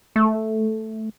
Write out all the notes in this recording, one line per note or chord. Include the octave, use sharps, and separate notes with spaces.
A3